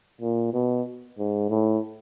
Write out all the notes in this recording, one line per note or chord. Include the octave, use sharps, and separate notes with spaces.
A#2
B2
G#2
A2